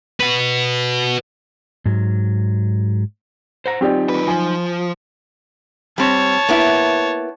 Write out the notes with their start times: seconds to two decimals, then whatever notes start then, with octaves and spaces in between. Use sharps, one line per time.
0.20 F#4 B4
1.86 G#2 F#3
3.66 C5 F#5 A#5
3.81 F#3 C4 D#4 F4 G4 D5
4.09 D#2 B4
4.28 F3 G#5
5.98 G3 C4 C#5 A5
6.49 A#3 B3 E4